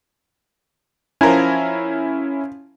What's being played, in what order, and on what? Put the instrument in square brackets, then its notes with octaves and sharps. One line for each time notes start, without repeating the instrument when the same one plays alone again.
[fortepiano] F3 A#4 G#5 [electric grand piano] C#4 E4